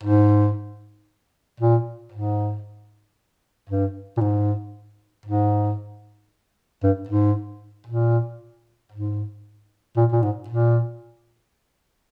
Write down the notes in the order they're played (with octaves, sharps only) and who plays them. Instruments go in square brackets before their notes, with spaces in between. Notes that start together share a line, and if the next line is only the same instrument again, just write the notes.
[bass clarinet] G#2
A#2
G#2
G2
A#2
G#2
G#2
G2
G#2
A#2
G#2
A#2
A#2
G#2
A#2